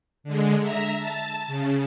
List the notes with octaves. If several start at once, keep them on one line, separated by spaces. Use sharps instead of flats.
D3 G#3
E5 A#5
A5
C#3